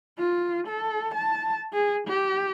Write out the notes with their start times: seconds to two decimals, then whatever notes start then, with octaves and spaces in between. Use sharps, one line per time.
0.19 F4
0.67 A4
1.15 A5
1.73 G#4
2.07 G4